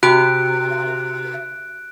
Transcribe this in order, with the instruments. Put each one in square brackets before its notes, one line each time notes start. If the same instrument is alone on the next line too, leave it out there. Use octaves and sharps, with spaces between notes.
[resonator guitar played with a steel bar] C3 [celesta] F#4 [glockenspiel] F#6 D7